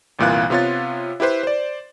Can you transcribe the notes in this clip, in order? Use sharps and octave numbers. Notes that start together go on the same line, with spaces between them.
G1 C2 A#2 E3 F5 F#6
C3 B3 F4 C#5 A6
E4 G4 B4 C5
C5 D5